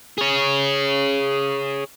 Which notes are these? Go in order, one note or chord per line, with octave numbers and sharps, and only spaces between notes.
G#4 C#5